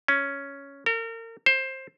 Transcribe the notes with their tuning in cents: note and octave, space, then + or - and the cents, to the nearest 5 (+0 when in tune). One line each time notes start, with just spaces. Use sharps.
C#4 +5
A#4 -35
C5 +15